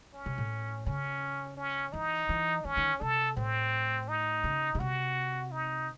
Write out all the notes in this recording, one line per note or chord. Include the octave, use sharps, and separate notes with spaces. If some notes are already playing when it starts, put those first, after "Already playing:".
C#4
C3
A2
C#3 C#4
C#4
E3 D#4
E3
D#3 C#4
D#3
C3 A4
A2 C4
D#4
C#3
C#3
C3 F#4
D#4